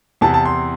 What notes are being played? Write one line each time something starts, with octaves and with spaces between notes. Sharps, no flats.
E2 C3 E3 A5
A5
C6